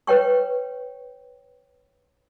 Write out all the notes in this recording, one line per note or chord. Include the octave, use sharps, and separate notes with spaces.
B4 C#5 G5 C#6